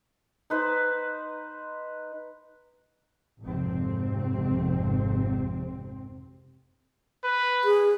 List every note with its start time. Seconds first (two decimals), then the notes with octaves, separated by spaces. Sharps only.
0.50 D#4 B4 C5
3.42 G#1 F2 C3 C4
7.24 B4
7.64 G#4